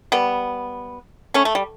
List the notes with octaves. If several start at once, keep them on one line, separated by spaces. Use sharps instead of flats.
G3 B3
A3 C#4
A3
G3